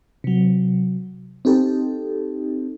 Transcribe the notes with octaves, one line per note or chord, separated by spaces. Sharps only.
C3 F#3
C4 D#4 G4 A4